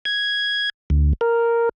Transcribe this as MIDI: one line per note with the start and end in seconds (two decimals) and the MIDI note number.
0.05 0.70 92
0.90 1.13 38
1.21 1.69 70